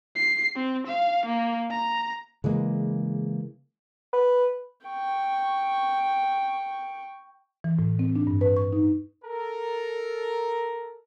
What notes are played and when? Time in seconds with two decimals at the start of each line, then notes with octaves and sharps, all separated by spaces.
0.16 C7
0.55 C4
0.87 F5
1.26 A#3
1.70 A#5
2.44 C#3 E3 G#3 A#3
4.13 B4
4.86 G5 C#6
7.64 E3
7.79 A2
7.99 C4
8.16 D4
8.27 G2
8.41 B4
8.57 C#6
8.72 D#4
9.24 A4 A#4